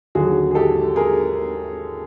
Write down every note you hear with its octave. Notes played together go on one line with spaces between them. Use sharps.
D#2 D3 F#3 F#4 G#4
G#4
G4 A4
G#4 A#4